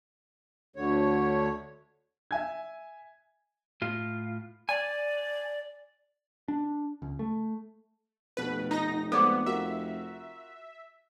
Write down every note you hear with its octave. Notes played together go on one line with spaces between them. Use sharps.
D2 D3 C#5
E5 G#5 G#6
A2 F4
D5 G#5
D4
C#2
A3
F1 B2 A3 B4
D#4 A#5 A#6
G#3 B3 A4 C5 D5 D6
F4 F#4 A#4 E5